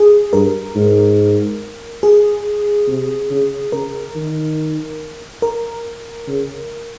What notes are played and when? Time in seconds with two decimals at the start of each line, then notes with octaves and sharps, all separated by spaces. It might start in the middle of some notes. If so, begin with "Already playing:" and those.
Already playing: G#4
0.33 G2 A#4
0.76 G#2
2.03 G#4
2.88 C3
3.31 C#3
3.72 C#3 A#4
4.16 D#3
5.42 A#4
6.28 C#3